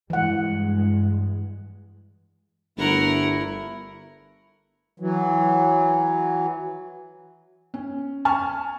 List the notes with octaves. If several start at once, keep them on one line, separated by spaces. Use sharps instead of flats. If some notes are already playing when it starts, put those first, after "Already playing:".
G2 E3 G#3 F#5
G1 A3 E4 A#4 F#5
E3 F#3
C#4
G#5 A5 C#6 F6